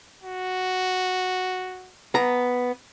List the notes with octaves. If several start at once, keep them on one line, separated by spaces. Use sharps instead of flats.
F#4
B3 A#5